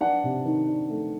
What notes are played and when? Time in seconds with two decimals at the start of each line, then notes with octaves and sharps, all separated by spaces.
0.01 D4 F#5
0.23 C3
0.45 D#3
0.68 D4
0.90 A3